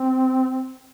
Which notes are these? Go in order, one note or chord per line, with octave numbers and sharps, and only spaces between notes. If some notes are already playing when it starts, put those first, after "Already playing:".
Already playing: C4